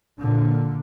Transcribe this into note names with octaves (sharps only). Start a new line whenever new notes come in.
A#2 D3